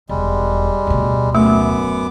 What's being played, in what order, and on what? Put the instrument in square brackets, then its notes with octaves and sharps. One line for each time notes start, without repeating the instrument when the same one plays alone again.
[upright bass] E1 [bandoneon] G3 G#3
[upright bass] D1 B2
[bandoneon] F#2 B3 D6 [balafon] A3